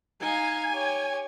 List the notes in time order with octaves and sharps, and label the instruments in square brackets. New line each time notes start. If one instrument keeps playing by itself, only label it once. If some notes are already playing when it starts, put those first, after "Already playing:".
[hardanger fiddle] D#4 F5 [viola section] G#5
[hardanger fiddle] G4 C#5